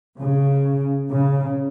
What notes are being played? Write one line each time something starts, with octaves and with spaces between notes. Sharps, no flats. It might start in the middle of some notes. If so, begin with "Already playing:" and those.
C#3
C#3